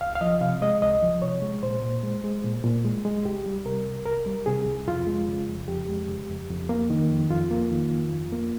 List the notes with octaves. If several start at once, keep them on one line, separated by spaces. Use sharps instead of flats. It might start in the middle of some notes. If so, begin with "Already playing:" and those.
C#2 F5
F5
F3 D#5
C3 F5
G#3 D#5
C#2 D#5
F3
C3 C#5
G#3
A#2 C5
A#2
G#3
G#3
A#2
A#2
G#3
G#3
C2 G4
G3
C3 A#4
C2
C2 A#4
G3
C3 G#4
C2
F2 F4
G#3
C#3
F2
F2 G4
G#3
C#3
F2
F2
A#3
D#3
F2
F2 F4
A#3
D#3
F2
F2
A#3